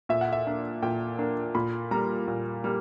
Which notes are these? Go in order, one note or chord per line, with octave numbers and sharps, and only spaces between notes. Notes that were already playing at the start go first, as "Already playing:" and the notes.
A#2 E5
F#5
E5
A#3 D4
A#2 G5
A#3 D4
A#2 B5
G3 A#3 A#5
A#2
G3 A#3